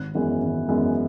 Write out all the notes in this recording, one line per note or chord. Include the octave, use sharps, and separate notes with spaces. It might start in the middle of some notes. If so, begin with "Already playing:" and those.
Already playing: G#1 F#6
F#2 E3 G#3 B3
G#1
F#2 E3 G#3 B3